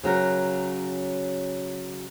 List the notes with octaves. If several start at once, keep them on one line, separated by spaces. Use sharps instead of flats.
C#3 F#3 A#4